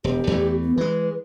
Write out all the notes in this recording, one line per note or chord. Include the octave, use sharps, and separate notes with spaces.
E1 G4
E2 E3 A3
B3
E3 G#3 B4